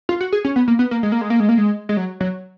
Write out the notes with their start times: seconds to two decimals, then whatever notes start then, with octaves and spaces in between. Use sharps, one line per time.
0.09 F4
0.21 F#4
0.32 G#4
0.45 C#4
0.56 B3
0.68 A#3
0.79 B3
0.91 A#3
1.03 G#3
1.12 A#3
1.21 G#3
1.30 A#3
1.40 G#3
1.49 A#3
1.58 G#3
1.89 G#3
1.97 F#3
2.20 F#3